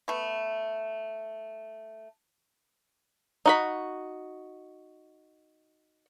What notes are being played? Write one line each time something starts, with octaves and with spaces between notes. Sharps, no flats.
A3 B3
D#4 F#4 B5